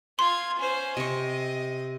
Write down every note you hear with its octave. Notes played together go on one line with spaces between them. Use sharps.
F4 C6 G#6
C#4 C5
C3 D#5 C#6